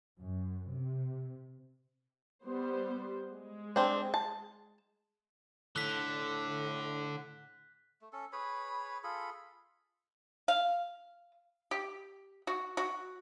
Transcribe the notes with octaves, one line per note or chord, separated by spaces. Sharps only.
F#2
C3
G3 B3 C5
G#3
C4 D4
A5
A2 D3 F#6 B6
A3
C#4 A4
G#4 B4 C#5 B5
F4 G#4 A4 B5
F5
G4
F#4
F#4